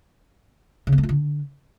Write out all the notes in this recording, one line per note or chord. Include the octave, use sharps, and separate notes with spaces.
C#3
B3
A3
F4
D3